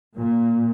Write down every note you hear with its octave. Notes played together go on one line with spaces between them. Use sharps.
A#2